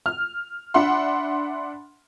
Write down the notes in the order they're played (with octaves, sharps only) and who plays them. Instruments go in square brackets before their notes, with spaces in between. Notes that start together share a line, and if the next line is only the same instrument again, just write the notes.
[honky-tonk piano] F6
D4 E5 F#5 B5 C6